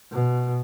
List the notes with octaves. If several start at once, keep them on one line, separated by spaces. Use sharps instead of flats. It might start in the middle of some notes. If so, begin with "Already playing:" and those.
B2